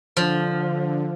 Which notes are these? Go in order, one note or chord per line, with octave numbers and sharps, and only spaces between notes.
D3 F3